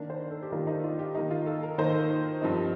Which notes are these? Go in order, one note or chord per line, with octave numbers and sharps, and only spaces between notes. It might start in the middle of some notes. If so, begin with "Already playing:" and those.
Already playing: D#3 A#3 D4
C5
A4
G4
D#3 A#3 D4 F4
D#4
F4
G4
D#3 A#3 D#4
F4
A4
A#4
D#3 A#3 D#4 C5
G2 F3 C4 D#4